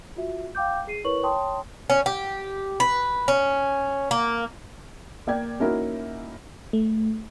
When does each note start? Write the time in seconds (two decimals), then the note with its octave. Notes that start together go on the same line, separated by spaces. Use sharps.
0.16 F4 F#4 E5
0.55 F5 G5 D6 G6
0.87 G#4 C7 D#7
1.04 E4 A#4 B4 C#5 C#6 F#7
1.23 C#5 G5 A5 C6 D#6
1.90 C#4
2.06 G4
2.80 B4
3.28 C#4
4.11 A#3
5.27 A#3 D5 G5 G#6
5.60 A#3 C#4 D#4 E4 F#4 A#4
6.73 A3